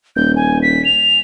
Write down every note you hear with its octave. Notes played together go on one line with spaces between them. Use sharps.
D#1 G6
G#5
B6
F7